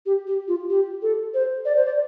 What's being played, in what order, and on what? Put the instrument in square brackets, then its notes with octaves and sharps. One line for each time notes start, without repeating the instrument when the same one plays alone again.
[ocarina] G4
G4
F4
G4
A4
C5
D5
C5
D5